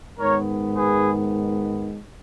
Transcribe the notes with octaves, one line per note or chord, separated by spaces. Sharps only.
G#2 D#3 G#3 B3 A#4 C#5
G#4 B4